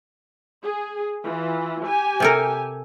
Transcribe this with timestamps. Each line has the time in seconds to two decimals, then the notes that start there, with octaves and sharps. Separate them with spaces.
0.64 G#4
1.24 E3 F4
1.85 G4 G#5
2.20 C3 A4 A#4